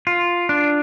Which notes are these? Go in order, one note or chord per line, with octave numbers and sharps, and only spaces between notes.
F4
D4